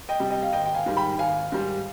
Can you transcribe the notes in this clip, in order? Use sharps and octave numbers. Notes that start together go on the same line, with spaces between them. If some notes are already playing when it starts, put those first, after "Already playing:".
D#5 G5
C3 G3
D#5 G5
F5
G#1 D#5 G5
G5
F5 G#5
G#2 D#3 G3
G5 B5
G#1 F5 G#5
G#2 D#3 G3